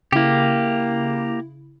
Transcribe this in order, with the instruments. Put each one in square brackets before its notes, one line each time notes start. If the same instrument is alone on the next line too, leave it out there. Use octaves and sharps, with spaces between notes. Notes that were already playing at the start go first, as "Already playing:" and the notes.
[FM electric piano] C#3 E4 [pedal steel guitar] A#3 G4